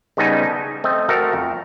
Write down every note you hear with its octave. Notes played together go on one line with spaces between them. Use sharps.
C#3 G3 B3 D#4 A4 G#5
A5
A3 C4 D#5
A3 C4 F#4 A4 A#4
F2